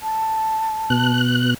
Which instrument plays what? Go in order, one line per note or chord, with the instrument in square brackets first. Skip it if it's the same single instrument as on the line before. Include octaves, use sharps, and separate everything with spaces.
[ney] A5
[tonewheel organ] B2 F#6